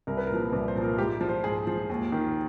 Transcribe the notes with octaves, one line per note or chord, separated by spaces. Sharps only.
C2 A#4
B4
A#4
A#2 F3
C2 B4
C5
A#2 F3
A#4
G#2 G4
F3
C5
G#2 G#4
F3
D#2
D#3